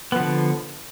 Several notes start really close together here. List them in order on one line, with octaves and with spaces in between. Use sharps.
B3 F3 D3